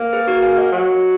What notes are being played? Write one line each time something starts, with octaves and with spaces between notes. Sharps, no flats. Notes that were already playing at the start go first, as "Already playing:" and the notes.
Already playing: A#3
G#4 B4
F#4 A#4
F5 G#5
D#5 F#5
F#3